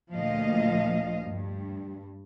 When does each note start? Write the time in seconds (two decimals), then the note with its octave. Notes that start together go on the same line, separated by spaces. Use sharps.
0.14 D2 A#2 F3 D#5 F5
1.26 G2